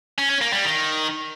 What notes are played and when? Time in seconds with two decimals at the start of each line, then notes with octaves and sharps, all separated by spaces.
0.18 C#4
0.30 C#4
0.41 A#3
0.53 G3
0.64 D#3